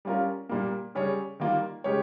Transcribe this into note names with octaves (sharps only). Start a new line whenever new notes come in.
G3 C#4 F4 A#4
A#2 G3 A#3
C#3 G3 C#4 G#4 C#5
D#3 G3 A#3 F4
C#3 G#3 C#4 G4 C#5